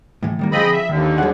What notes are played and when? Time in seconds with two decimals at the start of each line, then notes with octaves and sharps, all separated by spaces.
0.23 A2 E3
0.39 D#3 G3 A#3
0.52 D3 F3 C4 G#4 D#5 B5
0.73 E5
0.89 D#2 D3 D#3
1.18 F#3 G#4 F#5